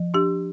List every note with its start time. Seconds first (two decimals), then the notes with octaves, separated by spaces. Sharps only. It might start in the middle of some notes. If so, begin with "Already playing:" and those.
Already playing: F3
0.14 D4 G4